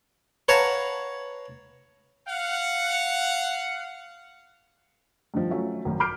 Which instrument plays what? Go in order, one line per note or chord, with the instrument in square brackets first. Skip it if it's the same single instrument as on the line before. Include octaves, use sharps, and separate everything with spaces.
[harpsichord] B4 C#5 F5 F#5 A5 A#5
[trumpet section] F5 F#5
[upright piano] G2 D#3 F3
F#3 A3 C#4 F4
G#1 F#2
B5 D6 F6 G6 C7 D7